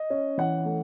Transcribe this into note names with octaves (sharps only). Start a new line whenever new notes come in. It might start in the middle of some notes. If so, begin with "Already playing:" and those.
Already playing: D#5
C#4
E3 F#5
A3